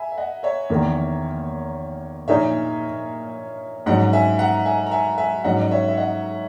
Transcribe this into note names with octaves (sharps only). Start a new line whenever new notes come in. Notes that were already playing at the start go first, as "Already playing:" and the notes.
Already playing: E5 G#5 A#5 B5
E5
D#5 F#5
C#5 E5
E2 D#3 A#3
A#2 A#3 D#4 G#4 C#5 E5
G#2 F#3 C#4 D#5 F#5
E5 G#5
F#5 A#5
E5 G#5
A#5
E5 G#5
E5 G#5
G#2 F#3 C#4 D#5 F#5
D#5
C#5 E5
E5
D#5 F#5